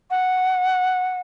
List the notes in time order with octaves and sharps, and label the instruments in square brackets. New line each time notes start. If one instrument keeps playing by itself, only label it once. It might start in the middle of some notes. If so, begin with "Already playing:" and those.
[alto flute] F#5